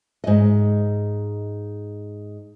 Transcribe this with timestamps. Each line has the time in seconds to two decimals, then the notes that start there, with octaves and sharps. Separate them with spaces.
0.24 G#2 D#5